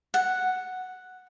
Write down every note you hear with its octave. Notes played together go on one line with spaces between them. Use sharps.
F#5